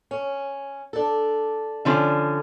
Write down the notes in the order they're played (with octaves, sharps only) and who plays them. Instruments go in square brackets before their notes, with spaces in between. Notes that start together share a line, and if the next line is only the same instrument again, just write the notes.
[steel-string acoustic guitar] C#4
D4 A4
[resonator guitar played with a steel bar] D3 F3 C#4